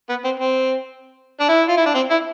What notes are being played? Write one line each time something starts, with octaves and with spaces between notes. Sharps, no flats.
B3
C4
C4
D4
E4
F4
E4
D4
C4
E4